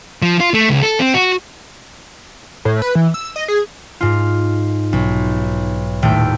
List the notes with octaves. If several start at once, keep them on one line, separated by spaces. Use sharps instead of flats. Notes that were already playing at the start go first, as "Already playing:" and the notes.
F3
F4
A3
C#2
A4
C4
F#4
A2
B4
E3
E6
D#5
G#4
G#2 F4
B1
D#1 A2 A3 G5